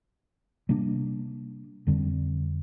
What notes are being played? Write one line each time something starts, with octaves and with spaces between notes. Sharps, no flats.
C3 G3 A#3 D4
F2 D3 G3 C4